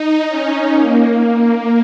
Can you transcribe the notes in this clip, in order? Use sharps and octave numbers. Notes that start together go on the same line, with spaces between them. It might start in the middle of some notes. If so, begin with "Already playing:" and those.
Already playing: D#4
C#4
A#3